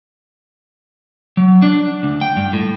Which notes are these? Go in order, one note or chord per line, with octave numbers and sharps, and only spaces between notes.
F#3
D4
D2
G5
G2
A2